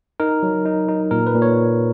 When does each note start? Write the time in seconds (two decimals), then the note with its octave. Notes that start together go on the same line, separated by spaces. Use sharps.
0.20 D#4 A#4
0.43 F#3
0.66 D#4
0.89 D#4
1.11 A#2 A#4
1.27 B4
1.34 A#2
1.42 C#5